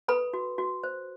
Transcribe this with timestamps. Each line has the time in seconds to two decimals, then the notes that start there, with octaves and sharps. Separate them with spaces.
0.08 A4 B4 B5
0.34 F#4
0.58 F#4
0.84 C5